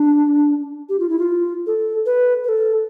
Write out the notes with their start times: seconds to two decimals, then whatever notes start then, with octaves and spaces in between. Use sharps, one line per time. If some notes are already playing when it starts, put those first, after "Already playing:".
Already playing: D4
0.89 G4
0.99 F4
1.09 E4
1.19 F4
1.67 A4
2.06 B4
2.44 B4
2.49 A4